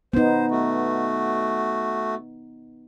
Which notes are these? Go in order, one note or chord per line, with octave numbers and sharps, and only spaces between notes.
B3 D#4 C5
A3 F#4